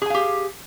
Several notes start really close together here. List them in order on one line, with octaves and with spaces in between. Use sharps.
G#4 G#5 F5 G4